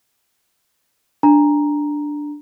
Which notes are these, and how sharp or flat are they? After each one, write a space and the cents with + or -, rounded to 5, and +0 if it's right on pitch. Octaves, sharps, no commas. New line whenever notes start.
D4 +0 A#5 +0